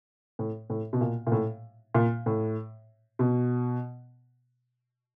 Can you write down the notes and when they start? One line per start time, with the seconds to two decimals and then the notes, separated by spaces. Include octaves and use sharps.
0.39 A2
0.70 A2
0.93 B2
1.01 A#2
1.27 A#2
1.32 A2
1.95 A#2
2.26 A2
3.19 B2